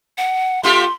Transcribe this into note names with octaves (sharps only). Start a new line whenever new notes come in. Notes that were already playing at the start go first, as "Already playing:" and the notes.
F#5
A3 F4 G4 C6